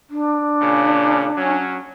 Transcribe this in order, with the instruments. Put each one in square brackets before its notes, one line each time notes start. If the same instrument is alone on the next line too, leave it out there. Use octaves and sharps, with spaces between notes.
[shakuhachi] D4
[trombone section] A#2 C#3
F#3 C#4